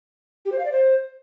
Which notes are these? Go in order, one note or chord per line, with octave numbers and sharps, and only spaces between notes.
G4
C5
F5
D5
C5